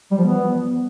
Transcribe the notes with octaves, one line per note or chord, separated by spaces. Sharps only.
G3
F3
B3